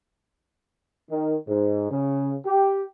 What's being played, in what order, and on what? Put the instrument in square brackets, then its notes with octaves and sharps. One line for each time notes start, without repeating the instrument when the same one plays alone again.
[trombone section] D#3
G#2
C#3
G4